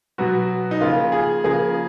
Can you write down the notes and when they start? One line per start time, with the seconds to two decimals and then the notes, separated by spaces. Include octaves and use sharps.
0.18 B2 F#3 B3 F#4
0.71 D#4
0.81 C#3 F3 A#3 F4
1.12 G#4
1.44 C#3 F3 A#3 G#4